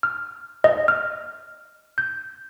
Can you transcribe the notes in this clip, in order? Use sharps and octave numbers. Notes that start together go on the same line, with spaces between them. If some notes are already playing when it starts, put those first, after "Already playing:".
F6
D#5
F6
G6